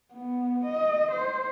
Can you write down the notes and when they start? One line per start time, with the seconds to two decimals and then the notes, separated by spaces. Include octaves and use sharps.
0.12 B3
0.65 D#5
1.11 C5